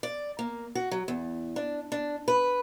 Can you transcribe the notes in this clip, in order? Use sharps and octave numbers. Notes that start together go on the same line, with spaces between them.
D5
A#3
F#4
F#3
E2
D4
D4
B4